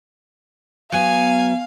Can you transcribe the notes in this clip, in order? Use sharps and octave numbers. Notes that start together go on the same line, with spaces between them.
F#3 B3 F5 G#5